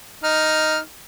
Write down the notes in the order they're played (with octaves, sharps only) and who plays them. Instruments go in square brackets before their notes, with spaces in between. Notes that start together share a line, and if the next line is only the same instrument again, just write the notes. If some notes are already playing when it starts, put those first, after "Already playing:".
[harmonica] D#4 F6